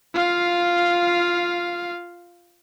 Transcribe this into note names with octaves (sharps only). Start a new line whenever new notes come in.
F4 F5